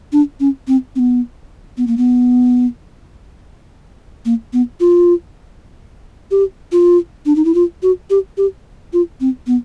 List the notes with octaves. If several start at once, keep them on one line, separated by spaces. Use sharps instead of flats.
D4
C#4
C4
C4
B3
B3
A#3
B3
A#3
B3
F4
G4
F4
D4
D#4
E4
F4
F#4
G4
G4
F4
C4
B3